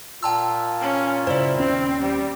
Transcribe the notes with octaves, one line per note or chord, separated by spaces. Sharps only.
A#2 F4 G5 A5 E6
C#4
G2 C#3 E4 C5 D5
D#2 C4 C#4
G3